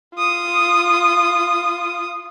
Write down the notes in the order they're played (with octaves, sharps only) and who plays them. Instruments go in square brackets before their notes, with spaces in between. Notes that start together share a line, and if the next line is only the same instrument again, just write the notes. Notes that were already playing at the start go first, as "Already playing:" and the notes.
[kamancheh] F4 D#6